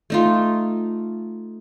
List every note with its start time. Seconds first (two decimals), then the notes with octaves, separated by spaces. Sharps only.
0.10 A3 D#4 F4